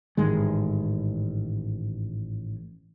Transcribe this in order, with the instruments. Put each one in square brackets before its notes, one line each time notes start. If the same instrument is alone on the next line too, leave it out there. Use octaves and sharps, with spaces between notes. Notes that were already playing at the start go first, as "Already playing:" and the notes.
[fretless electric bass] A1 G#2 D#3 G#3